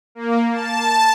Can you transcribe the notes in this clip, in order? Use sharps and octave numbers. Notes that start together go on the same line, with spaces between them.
A#3
A5